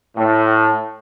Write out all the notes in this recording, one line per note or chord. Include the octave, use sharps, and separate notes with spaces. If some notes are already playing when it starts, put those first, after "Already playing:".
A2